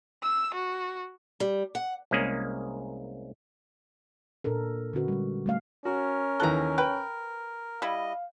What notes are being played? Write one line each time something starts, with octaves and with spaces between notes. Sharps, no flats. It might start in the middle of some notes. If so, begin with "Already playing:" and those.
E6
F#4
G3
F#5
C2 G#3 A#3 C#4 G#4
A#2 D4 A4 A#4
D3 C#4 F#4 B4
G3 G#3
G3 A3 F5
C#4 F#4 A#4
D#2 E3 A4 A#5 F#6
B4 G5
G3 E4 D#5 F5